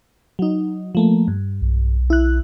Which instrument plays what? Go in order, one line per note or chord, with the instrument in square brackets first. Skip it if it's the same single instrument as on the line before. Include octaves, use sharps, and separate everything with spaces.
[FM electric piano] F#3 D#4
F3 A3 A#3
G2
[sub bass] B1
[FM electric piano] E4 F#6